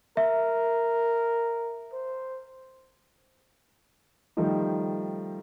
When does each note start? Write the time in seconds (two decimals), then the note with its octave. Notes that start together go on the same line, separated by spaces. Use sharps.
0.17 A#4 E5
1.93 C5
4.37 D#3 F3 G3 A3 D#4